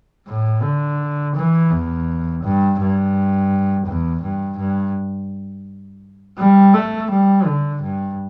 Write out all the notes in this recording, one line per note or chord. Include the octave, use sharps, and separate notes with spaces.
A2
D3
E3
E2
G2
G2
E2
G2
G2
G3
A3
G3
D3
G2